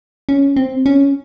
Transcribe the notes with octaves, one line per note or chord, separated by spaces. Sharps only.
C#4
C4
C#4